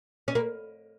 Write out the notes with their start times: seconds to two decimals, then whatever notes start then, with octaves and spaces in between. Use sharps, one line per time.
0.28 C#4
0.35 A#3